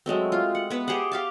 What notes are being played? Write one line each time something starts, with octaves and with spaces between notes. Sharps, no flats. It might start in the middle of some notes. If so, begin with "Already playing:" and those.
F#3 G#3 A3 C4
F4
F#5
B3 B4 E5
G4 G#4 C5 F#5
G4 F5 A5